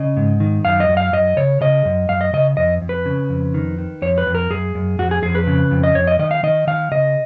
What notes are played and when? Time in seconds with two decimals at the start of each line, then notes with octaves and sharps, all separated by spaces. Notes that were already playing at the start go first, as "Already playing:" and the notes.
Already playing: C#3 D#5
0.17 G#2
0.40 D#3
0.64 F#2 F5
0.80 D#5
0.89 F#2
0.97 F5
1.13 F#2 D#5
1.37 C#3 C#5
1.61 C#3 D#5
1.85 F#2
2.09 F#2 F5
2.21 D#5
2.33 C#3 D#5
2.57 F2 D#5
2.81 F2
2.89 B4
3.06 C#3
3.30 F2
3.54 D#3
3.78 D#3
4.02 F2 C#5
4.18 B4
4.26 F2
4.35 A#4
4.50 F#2 G#4
4.75 F#2
4.99 F2 F#4
5.11 G#4
5.22 F2 G#4
5.35 B4
5.47 C#3
5.71 F2
5.84 D#5
5.95 F2 C#5
6.07 D#5
6.19 D#3 D#5
6.31 F5
6.43 D#3 D#5
6.67 D#3 F5
6.92 C#3 D#5